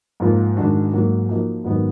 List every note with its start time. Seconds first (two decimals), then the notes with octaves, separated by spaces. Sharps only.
0.20 G#2 F3 A#3 F4 A#4
0.57 G#2 D#3 G#3 D4 F#4
0.93 G#2 F#3 A#3
1.29 F3 A#3 D#4 F#4
1.64 G#2 D#3 F#3 B3 D#4